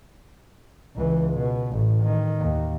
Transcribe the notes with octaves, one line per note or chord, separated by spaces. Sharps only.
C#2 E3
B2
A1 A2
D#3
D#2